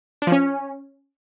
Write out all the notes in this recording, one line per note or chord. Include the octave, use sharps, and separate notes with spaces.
D4
F3
C#4